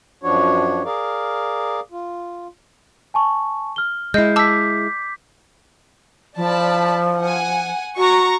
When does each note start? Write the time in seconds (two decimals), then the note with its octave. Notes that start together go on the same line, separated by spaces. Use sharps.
0.23 F#2 F3 D4 F#4 C#5
0.85 G#4 A#4 D5 F5
1.91 F4
3.14 G#5 A5 C#6
3.76 F6 G7
4.14 G#3 E4 D#5 G6 C7
4.36 A5 D6 E6 B6
6.36 F3 D5 A5 B5
7.19 F#5 G#5
7.97 F#4 A#5 C#6